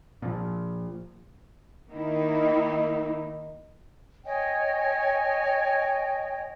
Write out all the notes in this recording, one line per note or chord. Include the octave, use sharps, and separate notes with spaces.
A#2 F3
D#3 A#3 D#4 E4
C#5 D#5 G5 G#5